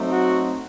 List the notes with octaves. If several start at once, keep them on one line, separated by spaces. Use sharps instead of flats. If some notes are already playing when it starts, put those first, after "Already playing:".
Already playing: F#3 A3 C4 D#4
F#4